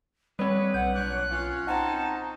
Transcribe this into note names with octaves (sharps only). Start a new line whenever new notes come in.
D3 G3 C4 B4 C#5
B1 F#5 G6
A#2 D4 C#5 F#6
C#4 F4
C4 C#4 D#4 F#5 A5 A#5